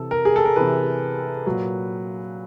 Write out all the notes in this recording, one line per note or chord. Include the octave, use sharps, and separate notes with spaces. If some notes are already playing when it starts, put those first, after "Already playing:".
Already playing: C3 E3 A4
A#4
G#4
A4
A#4
C3 E3 B4
A#2 F#3